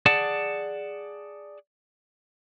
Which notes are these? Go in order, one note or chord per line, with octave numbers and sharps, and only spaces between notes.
G#4 D5 F#5 A5